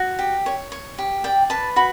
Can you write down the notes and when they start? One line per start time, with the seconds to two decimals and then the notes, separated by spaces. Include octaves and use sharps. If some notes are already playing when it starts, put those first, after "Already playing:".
Already playing: F#4
0.19 G4
0.46 C#5
0.72 C#5
0.98 G4
1.24 D5 G5
1.50 B4 A5
1.76 F#4 B5